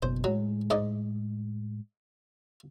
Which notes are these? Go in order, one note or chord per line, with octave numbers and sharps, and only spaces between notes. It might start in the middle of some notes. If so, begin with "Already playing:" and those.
F#1 B2 C5
A2 F#3 G#3
G#2 D5 D#5